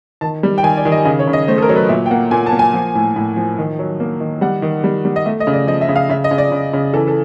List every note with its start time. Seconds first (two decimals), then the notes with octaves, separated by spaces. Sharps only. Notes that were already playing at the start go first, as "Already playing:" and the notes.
0.21 D#3 A5
0.43 G3
0.58 G5
0.63 D#3 G#5
0.77 D5
0.85 D#3
0.92 D#5
1.05 C#3 D#5
1.19 C#5
1.27 C#3
1.33 D#5
1.48 A3 C5
1.58 A4
1.62 A#4
1.69 F#3
1.76 B4
1.89 A#2 E5
2.06 G5
2.10 A#3 F#5
2.31 A#2 G#5
2.46 A5
2.52 A#3
2.59 G#5
2.74 F3
2.95 A2
3.16 A2
3.36 F3
3.58 D#3
3.79 F#3
4.00 A#3
4.20 D#3
4.41 G3 F#5
4.62 D#3
4.84 G3
5.05 G3
5.16 D#5
5.26 A3 E5
5.40 D#5
5.47 C#3
5.53 D5
5.67 F3 D#5
5.81 E5
5.89 C#3
5.96 F5
6.09 C#3 E5
6.24 D#5
6.31 C#3
6.38 D5
6.52 C#3
6.73 C#3
6.93 E3 A4
7.08 A4